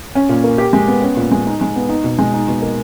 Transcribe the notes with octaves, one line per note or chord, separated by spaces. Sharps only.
C#4
A#2
A#3
G4
G#3
B3
C#4
A#2
G#3
D#4
G#3
B3
D#4
B2
G#3
D#4
B2
A#3